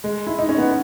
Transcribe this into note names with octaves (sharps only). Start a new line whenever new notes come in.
G#3
E4
D#4
C#4
B3